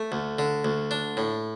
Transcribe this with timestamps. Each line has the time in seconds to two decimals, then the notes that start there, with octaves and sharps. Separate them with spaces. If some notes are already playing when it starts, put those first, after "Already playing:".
Already playing: A3
0.12 D2
0.39 D3
0.65 D2
0.91 D4
1.17 A2